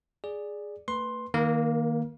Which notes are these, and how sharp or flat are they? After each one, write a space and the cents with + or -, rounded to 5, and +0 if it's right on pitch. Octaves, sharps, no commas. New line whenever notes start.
G#4 +0 D5 +0
A3 +40 B4 +0 C6 +10
D#3 +5 A#3 +0 A#4 +40